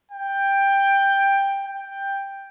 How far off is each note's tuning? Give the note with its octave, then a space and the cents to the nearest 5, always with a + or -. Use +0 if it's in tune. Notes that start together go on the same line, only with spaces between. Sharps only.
G5 +10
G5 +5